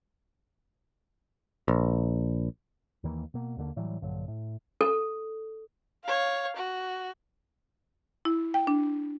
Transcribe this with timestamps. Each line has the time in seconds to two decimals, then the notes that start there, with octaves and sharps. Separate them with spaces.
1.68 A#1
3.03 D#2 D#3 E3 A#3
3.34 B2 A#3
3.57 D#2 D3 A#3
3.76 A2 E3 F#3 G3
4.01 A#1 G2 D3 F#3
4.28 A2
4.81 A4
6.05 C#5 F5
6.57 F#4
8.25 E4
8.54 G5
8.67 D4